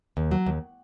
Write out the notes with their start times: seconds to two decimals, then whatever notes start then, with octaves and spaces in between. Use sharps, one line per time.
0.17 D#2
0.31 F#3
0.46 D#2